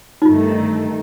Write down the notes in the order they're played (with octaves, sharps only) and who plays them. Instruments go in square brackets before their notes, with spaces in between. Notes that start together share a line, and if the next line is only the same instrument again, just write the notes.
[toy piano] D#4
[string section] G1 G2 D#3 A3 [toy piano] F4